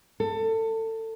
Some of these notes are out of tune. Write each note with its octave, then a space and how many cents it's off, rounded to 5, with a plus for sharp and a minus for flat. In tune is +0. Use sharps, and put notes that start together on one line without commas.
A4 +25